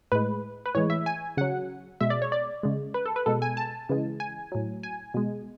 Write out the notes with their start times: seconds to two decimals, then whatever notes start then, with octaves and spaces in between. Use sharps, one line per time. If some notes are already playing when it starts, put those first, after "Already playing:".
0.12 A2 G#3 B4
0.66 B4
0.75 A2 E3 G#3 C#5
0.90 E5
1.06 G#5
1.37 C#3 F#3 F#5
2.01 B2 G#3 E5
2.10 D5
2.22 C#5
2.32 D5
2.63 C#3 G#3
2.94 B4
3.06 A4
3.16 B4
3.26 B2 G#3 A4
3.42 G#5
3.57 A5
3.89 C#3 E3 G#3
4.20 G#5
4.52 A2 F#3
4.83 G#5
5.14 B2 G#3